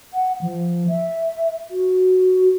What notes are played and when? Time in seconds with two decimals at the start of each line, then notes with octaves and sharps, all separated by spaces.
0.14 F#5
0.41 F3
0.88 E5
1.71 F#4